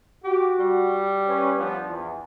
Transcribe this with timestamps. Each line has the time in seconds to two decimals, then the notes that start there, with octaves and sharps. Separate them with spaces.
0.24 F#4 G4
0.60 G3
1.27 C#4 B4 C#5
1.57 F3 B3 D4
1.87 E2